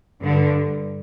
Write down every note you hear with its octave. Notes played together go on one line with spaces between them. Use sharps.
G2 D3